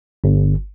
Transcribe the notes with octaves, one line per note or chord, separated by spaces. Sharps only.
G1